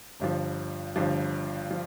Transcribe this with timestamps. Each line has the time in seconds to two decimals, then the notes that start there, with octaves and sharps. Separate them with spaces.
0.20 G1 G2 F3
0.96 G1 G2 F3
1.71 F3